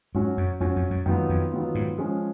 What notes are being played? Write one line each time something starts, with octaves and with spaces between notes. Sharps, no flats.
G#2 F#3 C#4 F#4
F#2
F2 F#3 C#4 F#4
F2
F#2
F#2 D#3 F#3 B3 F4
F2
D#3 F#3 B3 F4
G#2
F3 G#3 C#4